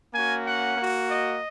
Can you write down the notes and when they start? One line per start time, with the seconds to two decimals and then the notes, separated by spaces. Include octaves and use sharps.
0.13 A#3 C#4 F#4 G#5
0.46 F#5
0.77 A#3 F#4
1.09 D#5